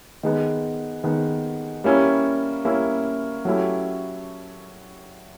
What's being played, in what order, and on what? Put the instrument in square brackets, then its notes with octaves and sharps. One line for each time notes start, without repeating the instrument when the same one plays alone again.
[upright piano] D#3 G#3 B3
D#3 G#3 B3
G3 A#3 C#4 E4
G3 A#3 C#4 E4
F#3 A3 C#4 E4 G4